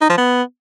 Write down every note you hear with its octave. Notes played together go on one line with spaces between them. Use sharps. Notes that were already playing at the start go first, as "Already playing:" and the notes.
D#4
F3
B3